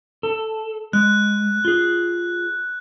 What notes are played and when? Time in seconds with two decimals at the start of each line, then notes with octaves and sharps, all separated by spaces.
0.23 A4
0.93 G#3 F#6
1.65 F4 G#4